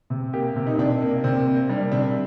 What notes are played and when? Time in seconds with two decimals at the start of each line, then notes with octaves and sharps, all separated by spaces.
0.10 C3
0.33 A#3 G4
0.56 C3
0.67 D#4
0.78 C3 D4
1.02 A#3
1.24 C3 C4
1.46 A#3
1.69 G3 D4
1.92 C3 D4